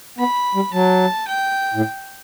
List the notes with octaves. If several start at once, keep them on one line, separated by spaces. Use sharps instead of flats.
B3 B5
G3
F#3 A5
G5
A2